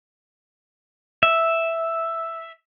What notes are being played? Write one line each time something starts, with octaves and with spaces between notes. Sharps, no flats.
E5